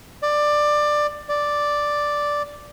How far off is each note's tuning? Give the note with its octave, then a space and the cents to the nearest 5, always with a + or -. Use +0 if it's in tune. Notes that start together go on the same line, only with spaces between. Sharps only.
D5 +15
D5 +0